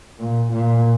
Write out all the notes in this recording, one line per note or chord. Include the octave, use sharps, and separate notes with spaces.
A#2
A#2